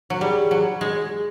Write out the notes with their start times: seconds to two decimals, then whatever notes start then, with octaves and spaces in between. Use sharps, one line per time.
0.10 F#3
0.21 G3 G#4
0.42 G#4
0.51 F#3
0.81 G#3